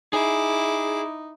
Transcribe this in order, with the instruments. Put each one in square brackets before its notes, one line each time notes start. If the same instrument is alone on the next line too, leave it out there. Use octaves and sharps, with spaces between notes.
[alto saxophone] D#4 [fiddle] E4 D6 [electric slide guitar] G#4